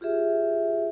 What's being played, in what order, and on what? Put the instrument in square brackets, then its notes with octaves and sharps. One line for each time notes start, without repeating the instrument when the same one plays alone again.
[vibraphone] F4 G4 G#4 E5